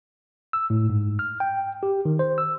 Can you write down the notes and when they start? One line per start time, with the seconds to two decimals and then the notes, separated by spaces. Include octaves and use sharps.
0.53 E6
0.70 A2
0.90 G#2
1.19 F6
1.40 G5
1.83 G4
2.05 D#3
2.19 C5
2.38 E6